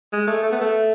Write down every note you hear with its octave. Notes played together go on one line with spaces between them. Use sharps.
G#3
A3
A3
B3
A3